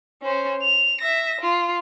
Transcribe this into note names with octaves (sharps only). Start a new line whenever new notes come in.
C#4 C5
F7
E5 A#6
F4